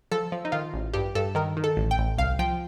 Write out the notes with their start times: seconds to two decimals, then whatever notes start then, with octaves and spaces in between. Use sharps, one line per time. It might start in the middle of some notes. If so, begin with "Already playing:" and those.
0.12 F3 A4
0.32 F3
0.45 D#4
0.52 D#3 F4
0.73 A1
0.93 G2 G4
1.15 G2 A4
1.35 D#3 A#4
1.57 D#3
1.64 A4
1.77 A1
1.91 G5
1.98 A1
2.18 C2 F5
2.39 F3 G5